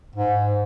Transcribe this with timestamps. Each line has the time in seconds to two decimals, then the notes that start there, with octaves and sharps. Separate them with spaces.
0.15 G#2